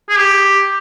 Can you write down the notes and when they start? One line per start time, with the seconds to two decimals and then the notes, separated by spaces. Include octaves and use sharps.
0.09 G#4
0.18 G4